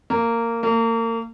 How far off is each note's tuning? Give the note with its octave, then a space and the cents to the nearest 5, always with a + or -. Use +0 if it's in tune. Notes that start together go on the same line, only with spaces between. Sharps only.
A#3 -15
A#3 -35